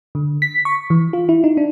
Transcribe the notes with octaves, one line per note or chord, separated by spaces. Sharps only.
D3
B6
C#6
E3
F4
E4
D#4
D4